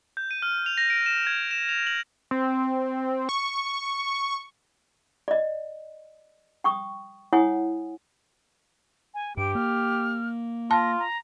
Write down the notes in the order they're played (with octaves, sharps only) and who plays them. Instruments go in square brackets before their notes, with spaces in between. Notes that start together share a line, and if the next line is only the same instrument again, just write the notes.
[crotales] G6
D#7
F6
F7
A#6
D7
E7
G#6
E7
F7
F#7
[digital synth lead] C4
C#6
[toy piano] D5 D#5
G5 C#6 D#6
E4 C#5 F#5 G#5 D#6
[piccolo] G#5
[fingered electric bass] G2 [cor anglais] G4 [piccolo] D7
[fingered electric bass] A#3 [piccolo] F6
[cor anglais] F4 [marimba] A5 [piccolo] A#6
[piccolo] A#5